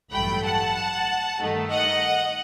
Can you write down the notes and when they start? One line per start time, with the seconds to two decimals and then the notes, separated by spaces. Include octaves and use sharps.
0.12 A1 G2 F#3 A3 G5 B5
0.43 F#5 A5
1.39 G2 D#3 A3 D#4
1.71 D#5 F#5